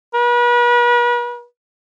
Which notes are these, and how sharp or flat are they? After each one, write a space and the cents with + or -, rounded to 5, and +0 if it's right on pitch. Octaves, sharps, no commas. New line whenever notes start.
B4 -40